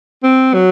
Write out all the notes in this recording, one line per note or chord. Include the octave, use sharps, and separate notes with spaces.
C4
F#3